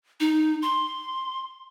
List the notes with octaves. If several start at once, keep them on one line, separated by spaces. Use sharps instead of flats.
D#4
C6